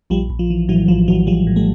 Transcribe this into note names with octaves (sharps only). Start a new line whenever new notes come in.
A#1 F3 G3
A#1
F3
E3
A2 E3 F#3
A#1 F3
A#1 E3 F#3
E3 F3 G3
A2
G3 A3